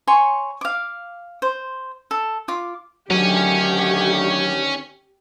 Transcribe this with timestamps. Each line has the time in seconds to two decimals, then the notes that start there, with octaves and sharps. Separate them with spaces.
0.07 C#5 G#5 C6 C#6
0.61 F5 D6
1.42 C5
2.11 A4
2.48 F4 D6
3.10 D2 D3 D#3 F#3 C#4 G4 G#5